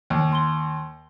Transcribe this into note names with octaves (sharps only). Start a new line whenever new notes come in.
D#2
C6 G7